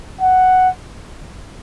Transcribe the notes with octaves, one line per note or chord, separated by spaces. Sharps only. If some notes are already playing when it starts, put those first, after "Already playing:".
F#5